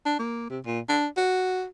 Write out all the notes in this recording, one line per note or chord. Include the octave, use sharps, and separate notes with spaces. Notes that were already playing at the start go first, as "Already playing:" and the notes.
D4
A#3
C3
A#2
D4
F#4